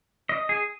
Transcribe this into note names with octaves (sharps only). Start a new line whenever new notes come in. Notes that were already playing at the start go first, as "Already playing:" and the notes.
D#5
G#4